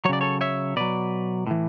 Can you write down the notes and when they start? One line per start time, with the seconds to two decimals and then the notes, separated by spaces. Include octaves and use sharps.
0.05 F#3 C#5
0.09 C#3 D5
0.21 A4 C#5
0.41 C#5 E5
0.76 B2 F#3 B4 D5
1.47 A2 E3